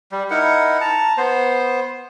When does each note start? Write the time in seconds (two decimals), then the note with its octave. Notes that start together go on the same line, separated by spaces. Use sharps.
0.12 G3
0.30 D#4 E4 A#4 F#5
0.81 A5 A#5
1.17 B3 C5